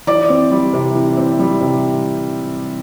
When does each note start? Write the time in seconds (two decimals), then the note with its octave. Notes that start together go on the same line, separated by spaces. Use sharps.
0.07 E3 D5 D6
0.30 C4
0.51 G3
0.74 C3
0.95 E3
1.17 C4
1.39 G3
1.61 C3